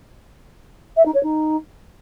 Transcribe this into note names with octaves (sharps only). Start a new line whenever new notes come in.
E5
D#4
C#5
D#4